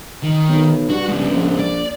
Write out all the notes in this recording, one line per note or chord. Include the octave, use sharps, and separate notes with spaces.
D#3
B1
G2 F#4
G#2 C#3
A#1
D5